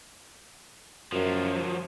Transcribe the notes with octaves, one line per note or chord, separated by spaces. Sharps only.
F#2 F3 F#3